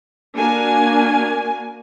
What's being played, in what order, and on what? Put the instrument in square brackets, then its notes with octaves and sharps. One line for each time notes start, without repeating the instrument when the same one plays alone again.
[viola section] A#3 D4 F#4 A#4 G#5